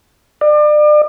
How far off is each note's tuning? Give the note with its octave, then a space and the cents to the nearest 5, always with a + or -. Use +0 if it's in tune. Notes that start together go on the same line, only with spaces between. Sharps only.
D5 +35